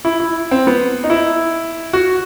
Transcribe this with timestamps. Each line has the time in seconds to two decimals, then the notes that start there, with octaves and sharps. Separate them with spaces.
0.05 E4
0.20 E4
0.51 C4
0.67 B3
1.04 D#4
1.10 E4
1.93 F#4